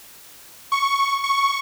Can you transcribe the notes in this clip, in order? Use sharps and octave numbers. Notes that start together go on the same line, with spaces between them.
C#6
C#6